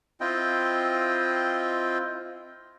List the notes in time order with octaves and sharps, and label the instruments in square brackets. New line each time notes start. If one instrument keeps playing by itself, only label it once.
[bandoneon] C4 E4 F4 D#5 G5